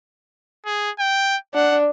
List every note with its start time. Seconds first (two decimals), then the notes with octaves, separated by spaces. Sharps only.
0.66 G#4
0.99 G5
1.54 D4 F#5